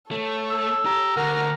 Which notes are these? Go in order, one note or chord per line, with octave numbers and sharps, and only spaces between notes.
A3 A4 C#5
E6
G4 A#5
D2 A#4 F#5 A#5 F6